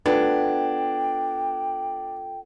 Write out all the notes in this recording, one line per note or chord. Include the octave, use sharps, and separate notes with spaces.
B3 D4 F4 A4 G5 G#6